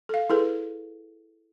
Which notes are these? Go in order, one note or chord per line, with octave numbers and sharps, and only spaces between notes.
A4 F5
E4 G#4 A4 B4